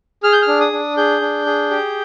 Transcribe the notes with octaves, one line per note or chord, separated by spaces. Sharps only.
G#4 F6
G6
F6
D4
D#6
D4
G#4 G6
D4
G#4
G4